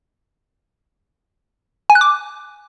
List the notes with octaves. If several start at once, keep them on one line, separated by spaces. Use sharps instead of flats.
G#5
F#6
D6